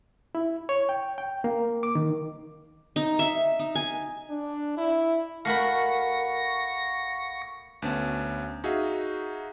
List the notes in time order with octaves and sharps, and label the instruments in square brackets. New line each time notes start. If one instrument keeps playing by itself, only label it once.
[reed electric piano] E4
C#5
G5
G5
A#3
D6
D#3
[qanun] D#4
E5
D#4
G#5
[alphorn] D4
E4
[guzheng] A3 F#4 A#4 [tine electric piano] F5 F#5 B5 [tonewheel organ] C#6 A#6
[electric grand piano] D2 B3 C#4 A5
D#4 F#4 G#4 E5 F5 G#5